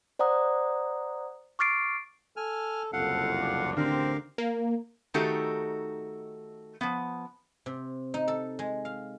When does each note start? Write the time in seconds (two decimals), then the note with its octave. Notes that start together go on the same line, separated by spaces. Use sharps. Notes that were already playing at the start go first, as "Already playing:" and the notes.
0.19 C5 D5 F#5 A#5 D#6
1.59 C#6 D6 F6 A6 C7 D7
2.37 A4 G#5 F6
2.93 F#1 C2 F2 A4 F5 F#5
3.41 D4
3.77 A1 D2 D3 C4 G4 A#4 F5
4.38 A#3
5.14 D#3 A3 D#4 F#4 G4 A4
6.81 F3 B3
7.66 C3
8.14 D#4
8.28 A4
8.59 G#3
8.85 F5